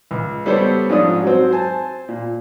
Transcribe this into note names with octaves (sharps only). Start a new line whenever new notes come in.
C#2
G3 B3 A4 C5 C#5
G#2 F3 C#4 D4 D#6
F#3 C4
C5 G#5 A5
A#2